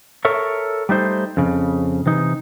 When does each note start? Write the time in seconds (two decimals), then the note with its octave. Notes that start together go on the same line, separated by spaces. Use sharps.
0.25 A4 A#4 C#5 E5
0.89 G3 A3 D#4 C5
1.37 F2 C#3
2.06 C3 E3 D#4